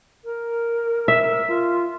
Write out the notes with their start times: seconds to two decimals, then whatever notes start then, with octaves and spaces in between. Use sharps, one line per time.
0.24 A#4
1.08 E5
1.48 F4